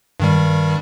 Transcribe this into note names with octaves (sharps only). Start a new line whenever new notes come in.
G2 D#3 G3